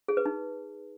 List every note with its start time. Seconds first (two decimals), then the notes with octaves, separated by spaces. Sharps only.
0.08 G#4
0.17 B4
0.26 D#4